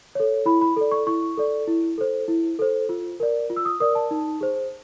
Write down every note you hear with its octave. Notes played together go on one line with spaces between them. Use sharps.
A4 C#5
E4 B5
B5
A4 D5
C#6
E4 C#6
A4 D5
E4
A4 C5
E4
A4 C5
F4
A#4 D5
F4
E6
D#6
A#4 D5 D#6
A5
D#4
G#4 C5